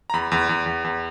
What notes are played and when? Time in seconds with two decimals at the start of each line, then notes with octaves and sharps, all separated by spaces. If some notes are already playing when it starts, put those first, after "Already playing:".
0.10 A#5
0.13 E2 B5
0.32 E2
0.49 E2
0.66 E2
0.84 E2